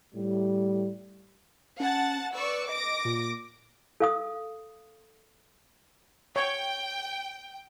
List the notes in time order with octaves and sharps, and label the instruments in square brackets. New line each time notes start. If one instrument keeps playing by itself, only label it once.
[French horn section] A2 G3
[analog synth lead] C#4 [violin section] F#5 A5 A6
[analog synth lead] B4 [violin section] D5 C#6 E6
[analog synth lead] D#5 [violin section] D6 A#6 D7
[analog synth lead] A#2
[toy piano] A4 F5 D#6
[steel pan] C#5 [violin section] G5